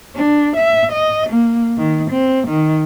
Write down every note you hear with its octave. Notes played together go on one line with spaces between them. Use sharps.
D4
E5
D#5
A#3
D#3
C4
D#3